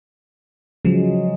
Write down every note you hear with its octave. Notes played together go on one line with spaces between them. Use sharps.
C#3 F3 F#3 G#3